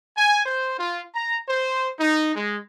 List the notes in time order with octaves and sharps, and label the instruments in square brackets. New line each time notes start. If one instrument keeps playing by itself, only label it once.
[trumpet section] G#5
C5
F4
A#5
C5
D#4
G#3